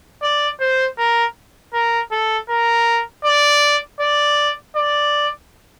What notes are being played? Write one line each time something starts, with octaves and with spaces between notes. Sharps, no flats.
D5
C5
A#4
A#4
A4
A#4
D5
D5
D5